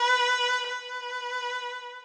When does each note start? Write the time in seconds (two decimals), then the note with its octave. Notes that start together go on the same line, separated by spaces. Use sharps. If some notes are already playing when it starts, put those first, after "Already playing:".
Already playing: B4
0.67 B4